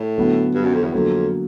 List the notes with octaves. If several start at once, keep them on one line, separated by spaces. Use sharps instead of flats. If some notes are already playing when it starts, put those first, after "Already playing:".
Already playing: A2
D3 F#3 B3
G2
F#2
F2
E2
F2 D3 F#3 A#3